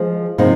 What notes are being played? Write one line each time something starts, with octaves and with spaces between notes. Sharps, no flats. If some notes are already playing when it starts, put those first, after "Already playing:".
Already playing: F3 G#3
C3 F3 A#3 D#4